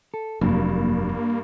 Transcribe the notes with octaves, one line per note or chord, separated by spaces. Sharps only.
A4
F1 G2 F#3 A#3